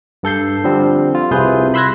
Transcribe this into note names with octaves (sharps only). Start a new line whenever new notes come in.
G2 A4 G6 C7
D3 F3 G3 C4
F4
C2 C3 F4 G#4 B4 G6
B5 C6 E6 F#6 G#6 A#6